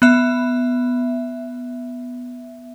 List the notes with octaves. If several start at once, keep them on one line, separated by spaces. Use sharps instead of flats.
B3 E5